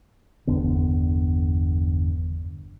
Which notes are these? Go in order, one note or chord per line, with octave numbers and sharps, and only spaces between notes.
G1 E2 D3 B3